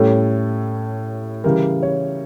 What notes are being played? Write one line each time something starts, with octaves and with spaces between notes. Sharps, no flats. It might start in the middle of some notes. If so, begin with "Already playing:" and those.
Already playing: A2 G3 C#4 A4
C#3 E3 G3 A#4
C#5